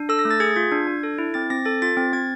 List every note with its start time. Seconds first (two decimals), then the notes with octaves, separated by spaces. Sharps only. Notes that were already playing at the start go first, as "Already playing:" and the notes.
Already playing: D4
0.09 A4 E6
0.19 A#6
0.25 A3
0.31 A6
0.40 G#4 G#6
0.56 F4 G#6
0.72 D4
0.87 D4
1.03 A4
1.18 E4
1.34 C4 A6
1.50 C4 A#6
1.65 A4 A6
1.82 F4 A6
1.97 C4 A6
2.13 C4 G#6